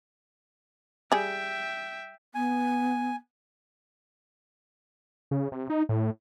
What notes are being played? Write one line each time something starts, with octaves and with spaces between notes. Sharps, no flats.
G3 G#4 E5 G5
B3 G#5
C#3
C3
D#4
A2